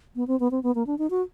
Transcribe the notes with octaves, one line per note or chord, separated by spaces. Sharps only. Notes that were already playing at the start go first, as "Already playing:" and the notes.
B3
C4
B3
C4
B3
A#3
D4
D#4
F#4